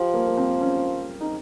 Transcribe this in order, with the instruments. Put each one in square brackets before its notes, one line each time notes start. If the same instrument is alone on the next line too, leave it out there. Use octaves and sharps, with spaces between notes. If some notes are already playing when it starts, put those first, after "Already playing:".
Already playing: [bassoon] F3 [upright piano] G4
[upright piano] A#3
A#3
C4
C#4
D#4